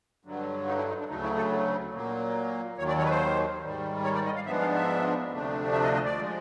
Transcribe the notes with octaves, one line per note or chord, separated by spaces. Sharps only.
G2 D3 F#3
D#4
E4
D#4
D4
D2 C#3 F#3 A3 D#4
E4
A4
A#2 F#3 A#3
D#2 D#3 F#3 C#5
D5
C#5
B4
C5
G#2 D#3 G3
C#5
D5
D#5
F5
G#2 F3 G#3 B3 D4 E5
F5
E5
D2 C3 F3 A3 D4
E5
D#5
D#5
D5
F3 G#3